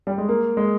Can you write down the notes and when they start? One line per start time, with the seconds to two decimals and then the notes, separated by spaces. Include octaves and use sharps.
0.07 G3
0.18 G#3
0.29 A#3
0.57 G#3